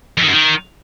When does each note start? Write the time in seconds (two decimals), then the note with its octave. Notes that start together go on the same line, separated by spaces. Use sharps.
0.18 F2
0.23 D#3
0.28 F#2
0.33 D#3